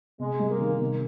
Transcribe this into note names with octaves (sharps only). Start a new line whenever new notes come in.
C3 G#3
G3
A#3
D#3
C3